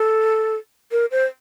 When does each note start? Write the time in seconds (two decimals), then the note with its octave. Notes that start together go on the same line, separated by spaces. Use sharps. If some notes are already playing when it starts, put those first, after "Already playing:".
Already playing: A4
0.92 A#4
1.11 C5